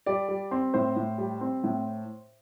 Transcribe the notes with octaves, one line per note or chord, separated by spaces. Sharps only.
G3 D5
G3
C4
A2 C5
A2
G3
C4
A2